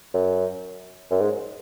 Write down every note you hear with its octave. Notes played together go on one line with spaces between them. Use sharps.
F#2
F#2
G#2